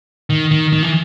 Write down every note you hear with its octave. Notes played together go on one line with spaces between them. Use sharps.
D#3
D#3
D#3
E3